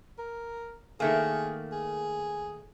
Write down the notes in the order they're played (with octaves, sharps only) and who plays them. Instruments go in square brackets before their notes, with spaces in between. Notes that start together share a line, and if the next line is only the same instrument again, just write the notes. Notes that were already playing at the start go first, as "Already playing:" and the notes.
[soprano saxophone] A#4
[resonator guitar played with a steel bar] D#3 A3 A#3 [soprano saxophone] G#4
[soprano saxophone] G#4